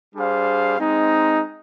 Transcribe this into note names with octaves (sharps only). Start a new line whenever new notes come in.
G3 D4 G#4 C5 F5
G#3 C4 D#4